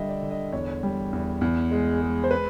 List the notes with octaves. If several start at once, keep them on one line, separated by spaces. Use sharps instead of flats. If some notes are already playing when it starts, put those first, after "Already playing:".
Already playing: D3 G3 D#5 E5
D5
D3
D#5
E2 C#5
G3
E2
E2
G#3
G#3
C5
B4